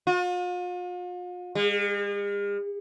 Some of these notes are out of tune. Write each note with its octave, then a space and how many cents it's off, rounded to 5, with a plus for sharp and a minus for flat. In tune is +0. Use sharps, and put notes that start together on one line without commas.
F4 +45
G#3 -45